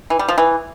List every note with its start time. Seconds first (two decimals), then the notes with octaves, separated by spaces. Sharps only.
0.10 E3
0.19 G3
0.29 F3
0.38 E3